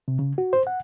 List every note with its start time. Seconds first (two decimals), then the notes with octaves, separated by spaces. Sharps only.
0.08 C3
0.19 C#3
0.38 F#4
0.53 C5
0.67 F#5